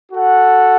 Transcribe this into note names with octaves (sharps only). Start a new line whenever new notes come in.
F#4 A4 F#5